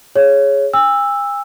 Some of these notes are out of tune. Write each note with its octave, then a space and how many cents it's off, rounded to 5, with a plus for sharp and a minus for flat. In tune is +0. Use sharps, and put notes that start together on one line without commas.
G#4 +0 C#5 +0
G#5 -45 E6 +0